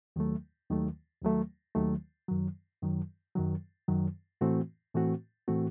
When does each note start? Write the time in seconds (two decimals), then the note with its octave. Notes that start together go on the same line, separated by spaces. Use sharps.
0.16 D#2 D#3 F#3 A3
0.70 D#2 D#3 F#3 A3
1.22 D#2 D#3 F#3 A3
1.75 D#2 D#3 F#3 A3
2.28 F#2 D#3 F#3
2.82 F#2 D#3 F#3
3.35 F#2 D#3 F#3
3.88 F#2 D#3 F#3
4.41 A2 E3 A3 C4 F#4
4.94 A2 E3 A3 C4 F#4
5.47 A2 E3 A3 C4 F#4